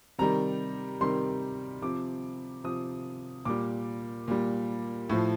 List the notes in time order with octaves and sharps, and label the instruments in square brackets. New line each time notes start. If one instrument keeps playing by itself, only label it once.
[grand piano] C3 D#3 G3 A#5
C3 D#3 G3 C6
C3 F3 D6
C3 F3 D#6
A#2 G3 D6
A#2 G3
A2 F3